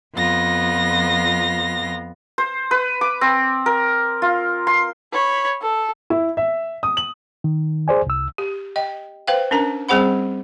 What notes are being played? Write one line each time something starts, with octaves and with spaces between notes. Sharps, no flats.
F2 B3 F4 A#6
C5
B4
D6
C4
A#4
F4
C6
C#5 B5
A4
E4
E5
D#6
F#7
D#3
G#4 C5 D5 G#5
C2 E6
G4
D#5 G5
B4 C5 F5 G5
C#4 D4 A#4 A#5
G3 C4 G#4 C5 F#5 B5